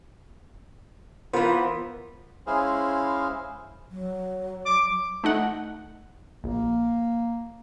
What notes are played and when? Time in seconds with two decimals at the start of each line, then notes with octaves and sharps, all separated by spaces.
1.33 E3 B3 F4 A#4 C5
2.47 G#3 C#4 E4 G#4 C5 F5
3.91 F#3
4.66 D6
5.24 A3 D#4 F#5
6.44 A#1 A#3